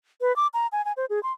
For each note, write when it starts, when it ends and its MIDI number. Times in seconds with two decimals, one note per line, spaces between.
0.21 0.35 71
0.36 0.47 86
0.54 0.67 82
0.72 0.84 80
0.85 0.93 80
0.97 1.06 72
1.10 1.22 68
1.23 1.32 84